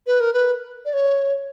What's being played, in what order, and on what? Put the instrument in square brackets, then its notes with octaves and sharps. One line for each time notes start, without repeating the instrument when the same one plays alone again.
[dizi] B4
A#4
B4
D5
C#5